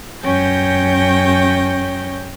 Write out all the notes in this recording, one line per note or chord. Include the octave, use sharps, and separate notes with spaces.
F#2 C#4 C#5 G5 G6 A#6